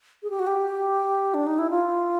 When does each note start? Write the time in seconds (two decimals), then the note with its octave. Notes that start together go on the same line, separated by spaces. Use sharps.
0.23 G#4
0.30 G4
0.39 F#4
0.47 G4
1.34 D4
1.47 D#4
1.59 E4
1.70 F4